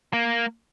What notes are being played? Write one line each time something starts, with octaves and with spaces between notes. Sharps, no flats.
A#3